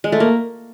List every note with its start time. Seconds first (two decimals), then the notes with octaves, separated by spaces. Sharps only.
0.04 G#3
0.12 A3
0.20 A#3